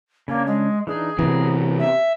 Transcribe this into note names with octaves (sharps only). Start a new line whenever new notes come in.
C#3 A#3 C#4 D4
G#3
E3 D4 D#4 G#4
C3 E3 B3 C4 A#5
E5